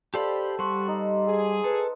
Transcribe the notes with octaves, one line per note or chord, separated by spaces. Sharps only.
F4 G4 A4 C5 D5 F5 B5
G3 C5 F#5 C#6
D#4 G4
G#4
A4 B4